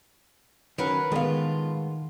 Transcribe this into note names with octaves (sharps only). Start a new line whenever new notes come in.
D#3 F#3 C#4 A#4 B4 F#5
A2 D#3 G#3 B3 F4